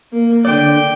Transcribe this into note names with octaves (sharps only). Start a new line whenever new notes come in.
A#3
D3 D5 G5